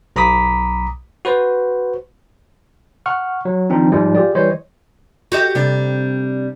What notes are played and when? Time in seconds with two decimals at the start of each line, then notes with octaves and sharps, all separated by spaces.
0.16 B1 A#5 B5 D6 D#6 B6
1.25 F#4 B4 C5
3.06 F#5 C#6 F6
3.45 F#3
3.70 D#3 F3 C4 D4 D#4
3.92 G#2 F3 G3 G#3
4.15 F4 G4 G#4 D5
4.35 E3 G3 C5 C#5 D#5
5.32 F#4 G4 D#5
5.55 C3 G3 D4